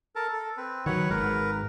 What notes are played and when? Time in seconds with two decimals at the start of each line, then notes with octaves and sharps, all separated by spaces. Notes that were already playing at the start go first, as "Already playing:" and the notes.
0.16 A4 A#4 A5
0.33 A4
0.57 C4 B4
0.86 D#3 F#3 B4 C#5 F#5
1.10 G#1 G#2 A#4 B4